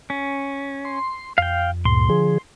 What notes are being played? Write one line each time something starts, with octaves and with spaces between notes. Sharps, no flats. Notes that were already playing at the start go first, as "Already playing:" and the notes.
C#4
C6
F2 F5 G5
D2 G2 A#2 C6
D3 F3 G#4